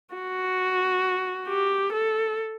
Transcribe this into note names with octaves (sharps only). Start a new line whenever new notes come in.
F#4
G4
A4